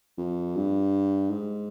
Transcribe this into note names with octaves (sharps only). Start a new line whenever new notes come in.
F2
G2
G#2